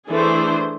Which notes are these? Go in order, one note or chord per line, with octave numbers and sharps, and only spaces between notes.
E3 A3 D4 G#4 C5